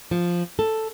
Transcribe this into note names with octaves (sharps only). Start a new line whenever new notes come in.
F3
A4